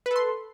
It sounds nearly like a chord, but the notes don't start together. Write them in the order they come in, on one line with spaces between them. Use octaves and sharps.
B4 A4 C6